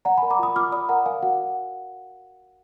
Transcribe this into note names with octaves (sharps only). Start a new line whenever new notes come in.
D5 F#5 A#5
G#5 B5
A#4
A#5 D6
F4 B5 D#6
F4 D6 F6
D5 B5 D#6
A#4 F#5 A#5
A#4 F5 G#5
F#4 F#5